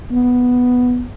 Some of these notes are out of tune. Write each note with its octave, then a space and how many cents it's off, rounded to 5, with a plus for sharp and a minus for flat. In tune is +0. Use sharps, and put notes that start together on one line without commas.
B3 +0